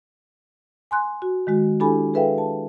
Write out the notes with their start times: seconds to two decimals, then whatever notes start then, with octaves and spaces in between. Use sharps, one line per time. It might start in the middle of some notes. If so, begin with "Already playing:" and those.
0.91 G#5 C6 F#6
1.22 F#4
1.47 D#3 G#3 F#4
1.80 D4 E4 G4 A4 G#5 B5
2.14 G#4 A4 B4 E5 F5 G5
2.38 A5